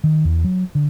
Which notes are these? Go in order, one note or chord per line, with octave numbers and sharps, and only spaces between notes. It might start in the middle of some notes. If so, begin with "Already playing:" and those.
D#3
E2
F#3
D3